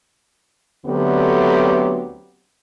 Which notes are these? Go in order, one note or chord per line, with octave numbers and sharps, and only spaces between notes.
D2 D3 F#3 B3 C4 G4